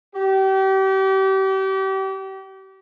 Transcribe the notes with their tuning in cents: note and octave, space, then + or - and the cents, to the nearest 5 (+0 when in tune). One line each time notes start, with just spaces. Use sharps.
G4 -35